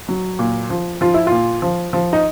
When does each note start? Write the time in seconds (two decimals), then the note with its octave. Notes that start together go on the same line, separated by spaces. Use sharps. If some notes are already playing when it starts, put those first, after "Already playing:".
0.09 F#3
0.39 A#2
0.70 F3
1.01 F3 F4
1.14 E4
1.27 A#2 F4
1.62 F3
1.93 F3
2.13 D#4